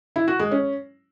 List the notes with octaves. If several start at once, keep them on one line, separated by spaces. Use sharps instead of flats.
E4
F#4
G#3
C#4